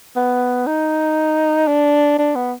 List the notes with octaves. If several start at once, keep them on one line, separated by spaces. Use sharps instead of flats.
B3
D#4
D4
D4
B3